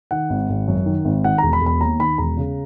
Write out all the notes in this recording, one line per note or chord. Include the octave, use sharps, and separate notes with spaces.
D#3 F#5
G#1
G#1
F#2
D#3
G#1
D#3 F#5
E1 A#5
B5
E1
B5
D#2 A#5
D#3 B5
E1 A#5
C#3